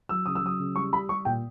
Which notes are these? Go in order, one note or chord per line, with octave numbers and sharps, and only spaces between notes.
F#3 E6
C#3 D#6
E6
F#3 D#6
C#3
G3 C#6
G3 B5
G3 C#6
A#2 G5